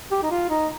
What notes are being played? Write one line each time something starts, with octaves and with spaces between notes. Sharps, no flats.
G4
D#4
F4
D#4